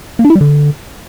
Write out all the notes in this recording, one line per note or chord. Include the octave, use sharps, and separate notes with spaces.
A#3
D4
E4
G3
D3